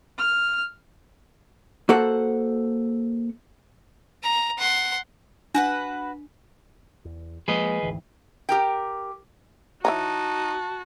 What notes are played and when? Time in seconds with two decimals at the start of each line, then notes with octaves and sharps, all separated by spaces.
0.18 F6
1.89 A#3 F#4 A4 C5 F#5
4.23 A#5
4.58 F#5 C6
5.55 D4 F#4 B4 F#5
7.05 E2
7.48 F3 G#3 A#3 G#4 B4 D#5
7.83 G#1 D2 E3
8.49 G4 A#4 G5
9.85 E3 D#4 F#4 C#5 A5 A#5